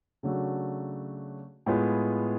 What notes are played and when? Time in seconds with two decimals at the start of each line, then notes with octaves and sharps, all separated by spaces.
0.23 C#3 F#3 A3 D4 F#4
1.66 A2 G#3 B3 F4 G#4